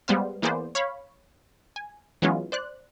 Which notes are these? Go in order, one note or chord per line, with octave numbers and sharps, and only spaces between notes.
G3 G#3 B3 C5 F5
E3 A#3 B3 G#4 C5 D5
C#5 F5 B5
G#5
E3 F#3 G#3 B3 C#4 F4
C5 D5 F#6